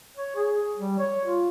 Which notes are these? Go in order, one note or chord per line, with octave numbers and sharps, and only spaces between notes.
C#5
G#4
G3
C#5
F4